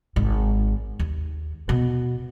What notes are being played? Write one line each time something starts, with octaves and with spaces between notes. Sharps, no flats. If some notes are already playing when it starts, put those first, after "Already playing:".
G#1 G#2
D#2
B2